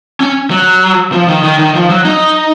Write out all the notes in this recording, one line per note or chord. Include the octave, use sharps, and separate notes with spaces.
C#4
F#3
F3
D#3
D#3
D#3
F3
F#3
D#4